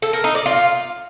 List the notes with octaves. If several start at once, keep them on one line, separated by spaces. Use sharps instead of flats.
A4
A#4
D#4
D5
F4